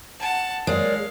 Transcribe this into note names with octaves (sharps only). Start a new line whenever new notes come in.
F#5 A5
G#3 A#4 C#5 D5 F5